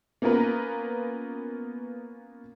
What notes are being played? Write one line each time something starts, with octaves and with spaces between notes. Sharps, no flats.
A#3 B3 C#4 F4 A#4 B4